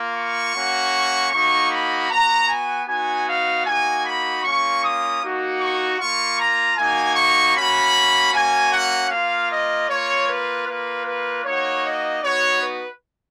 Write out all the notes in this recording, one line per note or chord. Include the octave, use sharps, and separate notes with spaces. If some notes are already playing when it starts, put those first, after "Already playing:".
Already playing: A#3 F4
C#6
A#3 C#4 F#4
A#3 D#4 F#4 C#6
B5
B3 F#4 A#5
G#5
B3 D#4 F#4 G#5
F5
A#3 D#4 F#4 G#5
B5
A#3 C#4 F4 C#6
D#6
A#3 D#4 F#4
C#6
A#3 F4 C#6
A#5
A#3 D#4 F#4 G#5
C#6
A#3 C#4 F#4 B5
A#3 C#4 F#4 G#5
F#5
A#3 F4 F5
D#5
A#3 F4 C#5
B4
A#3 F4 B4
B4
A#3 D#4 F#4 C#5
D#5
B3 D#4 F#4 C#5
B4